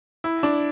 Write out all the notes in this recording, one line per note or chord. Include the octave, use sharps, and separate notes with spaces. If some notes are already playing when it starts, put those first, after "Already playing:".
E4
D4